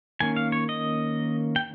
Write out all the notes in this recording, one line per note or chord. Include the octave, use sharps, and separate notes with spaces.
D#3 A#3 C#4 G#5
F5
C#5
D#5
G5